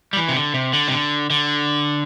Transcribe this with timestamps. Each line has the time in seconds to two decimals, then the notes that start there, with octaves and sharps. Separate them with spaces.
0.13 G3
0.17 E3
0.29 C3
0.35 D3
0.54 C3
0.73 D3
0.88 C3
0.92 D3
1.30 D3